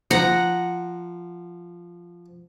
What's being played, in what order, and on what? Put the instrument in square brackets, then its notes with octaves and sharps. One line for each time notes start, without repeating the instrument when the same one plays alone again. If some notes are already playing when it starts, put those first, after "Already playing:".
[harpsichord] F3 [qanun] F#5 A#5